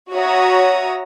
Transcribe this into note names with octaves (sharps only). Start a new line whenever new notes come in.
F#4 C#5 E5 A#5 D#6